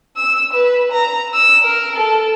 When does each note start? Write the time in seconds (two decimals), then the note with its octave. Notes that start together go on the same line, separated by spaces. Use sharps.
0.16 E6
0.53 B4
0.92 A#5
1.33 E6
1.64 A#4
1.96 A4